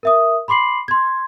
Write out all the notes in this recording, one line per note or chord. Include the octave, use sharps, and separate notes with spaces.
A#4 E5 D#6
B5 C6 D6 C7 F#7
C6 G#6